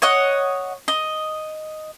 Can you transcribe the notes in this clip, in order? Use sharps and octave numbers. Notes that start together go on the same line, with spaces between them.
C#5 D#5 F#5
D#5